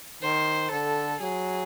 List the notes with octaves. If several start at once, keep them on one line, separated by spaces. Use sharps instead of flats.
D#3 C5
D3 A4
F#3 G#4